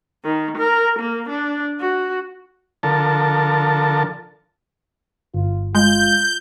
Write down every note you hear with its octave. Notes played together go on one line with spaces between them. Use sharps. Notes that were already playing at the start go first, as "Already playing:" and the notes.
D#3
A#4
A#3
D4
F#4
D3 F3 A4 A#4 A5
G1 F4
G#3 F4 G6